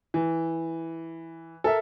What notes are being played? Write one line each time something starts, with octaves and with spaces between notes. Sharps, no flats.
E3
A4 A#4 E5